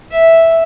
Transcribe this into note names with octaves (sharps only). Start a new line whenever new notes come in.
E5